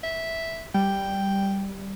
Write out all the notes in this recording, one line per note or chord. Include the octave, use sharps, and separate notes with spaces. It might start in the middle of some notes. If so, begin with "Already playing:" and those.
E5
G3 G5